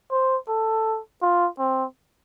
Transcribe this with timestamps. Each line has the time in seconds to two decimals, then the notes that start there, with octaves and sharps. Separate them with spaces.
0.11 C5
0.48 A4
1.22 F4
1.59 C4